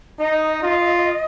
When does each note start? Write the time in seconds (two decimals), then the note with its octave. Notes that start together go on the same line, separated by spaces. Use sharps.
0.19 D#4 D#5
0.62 F4